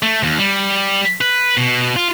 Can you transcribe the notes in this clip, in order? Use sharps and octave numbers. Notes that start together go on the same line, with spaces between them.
A3
D#2
G3
B4
B2
F4